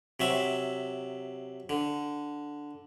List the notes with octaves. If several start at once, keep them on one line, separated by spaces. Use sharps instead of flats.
C3 F#3 E5
D3